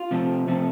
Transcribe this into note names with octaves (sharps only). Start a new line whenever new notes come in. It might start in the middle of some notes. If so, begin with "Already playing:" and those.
Already playing: F4
C3 F3 A3 C4
C3 F3 A3 C4